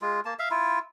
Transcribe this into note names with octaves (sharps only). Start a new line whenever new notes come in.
G#3 F4
A#3 A5
E5 F5
E4 F4